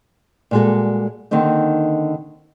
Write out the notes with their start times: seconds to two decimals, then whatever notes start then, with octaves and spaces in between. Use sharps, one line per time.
0.51 A#2 G3 G#3 B3 F#4 A4
1.31 D3 D#3 A#3 C4 D#4